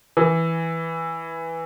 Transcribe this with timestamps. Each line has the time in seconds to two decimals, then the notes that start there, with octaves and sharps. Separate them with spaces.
0.17 E3